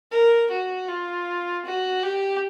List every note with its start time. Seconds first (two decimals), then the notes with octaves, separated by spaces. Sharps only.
0.11 A#4
0.51 F#4
0.88 F4
1.65 F#4
2.03 G4